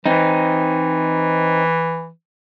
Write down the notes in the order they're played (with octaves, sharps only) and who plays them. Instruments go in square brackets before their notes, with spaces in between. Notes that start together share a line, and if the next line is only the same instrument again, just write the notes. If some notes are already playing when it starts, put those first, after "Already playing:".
[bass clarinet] E3 [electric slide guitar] C4 D#4